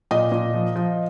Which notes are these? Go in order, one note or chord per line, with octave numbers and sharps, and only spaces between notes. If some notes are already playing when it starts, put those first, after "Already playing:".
A#2 D#5
A#2
F3
F3